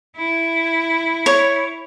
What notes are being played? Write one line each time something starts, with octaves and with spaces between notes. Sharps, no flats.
E4
C#5